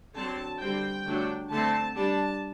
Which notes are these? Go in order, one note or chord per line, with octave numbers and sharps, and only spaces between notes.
D3 F#3 C4 A5
D3 G3 C4 G5
D3 F#3 A3 D4
D3 A3 C4 A5
G3 D4 A5